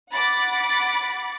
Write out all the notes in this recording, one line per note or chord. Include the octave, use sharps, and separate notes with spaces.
F#5 B5 D6 A6